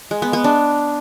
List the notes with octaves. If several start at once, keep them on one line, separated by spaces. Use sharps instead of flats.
G#3
B3
B3
D4